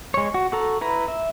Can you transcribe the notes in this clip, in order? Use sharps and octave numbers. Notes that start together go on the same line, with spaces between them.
G#3 C#5
F#4
F#4 A4 A#5
E4 B4 A#5
E5